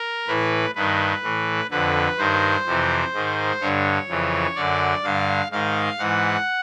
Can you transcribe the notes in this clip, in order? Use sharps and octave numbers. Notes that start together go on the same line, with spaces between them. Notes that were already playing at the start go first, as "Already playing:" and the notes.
Already playing: A#4
A2 E3 B4
G2 D#3 B4
A2 E3
F2 D3 B4
G2 D#3 C5
F2 C3 E3
G#2 D#3
G2 D3 C#5
F2 C#3 E3
F#2 D3 D5
G2 D3 F5
G#2 D#3 F5
G#2 E3 F#5